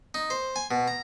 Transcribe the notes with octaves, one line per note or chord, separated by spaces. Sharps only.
D#4
C5
G#5
B2
A#5